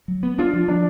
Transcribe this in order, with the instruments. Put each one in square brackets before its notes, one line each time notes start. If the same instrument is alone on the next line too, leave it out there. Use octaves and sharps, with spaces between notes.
[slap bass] F#3
B3
[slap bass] D4 [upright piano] F4
[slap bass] F3
[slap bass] F3 [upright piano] D4